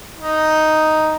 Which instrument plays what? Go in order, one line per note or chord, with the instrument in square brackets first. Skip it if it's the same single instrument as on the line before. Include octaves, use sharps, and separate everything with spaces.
[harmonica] D#4